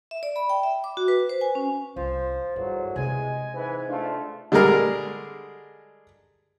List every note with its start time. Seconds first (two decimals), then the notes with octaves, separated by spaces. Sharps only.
0.11 E5
0.23 D5
0.36 B5
0.50 G5
0.63 E5
0.84 D6
0.97 F#4
1.08 B4
1.29 C5
1.41 G#5
1.55 C#4
1.96 C2 F3 C5
2.56 E2 G2 D3 F#3
2.96 C3 G#3 C4 G#5
3.53 G#2 E3 B4
3.88 A3 D4 F4
4.52 D3 G3 G#3 G#4 A#4